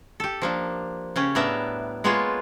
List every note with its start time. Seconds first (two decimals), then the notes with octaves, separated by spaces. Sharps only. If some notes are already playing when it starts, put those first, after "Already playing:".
0.20 G4 A4
0.42 F3 A#3 D4
1.16 C#3 C#4 G4
1.35 A2 G3 B3 D4 A#4 E5
2.04 G#3 A#3 B3 F4 G#4 C#5